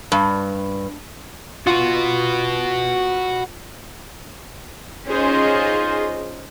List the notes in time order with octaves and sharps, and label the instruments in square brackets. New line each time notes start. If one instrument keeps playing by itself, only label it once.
[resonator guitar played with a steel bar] G2
[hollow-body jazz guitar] F4 [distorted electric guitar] F#4 B4
[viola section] C#4 D#4 F4 G#4 C5 D#5